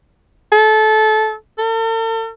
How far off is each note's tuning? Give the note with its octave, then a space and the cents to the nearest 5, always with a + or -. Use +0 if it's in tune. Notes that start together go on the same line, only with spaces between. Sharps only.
A4 -25
A4 +45